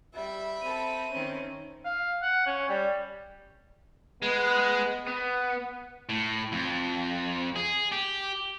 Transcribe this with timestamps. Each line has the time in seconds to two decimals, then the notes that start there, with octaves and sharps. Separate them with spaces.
0.14 G3 E5 B5
0.62 C4 A4 D#7
1.11 D#3 C4 C#4
1.85 F5
2.22 F#5
2.46 C#4
2.69 G3
4.22 G#3 B3
5.07 B3
6.09 A2
6.52 F2
7.56 G#4
7.92 G4